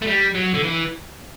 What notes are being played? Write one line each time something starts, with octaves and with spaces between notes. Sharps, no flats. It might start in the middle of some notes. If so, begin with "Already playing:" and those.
A3
G3
F#3
D3
E3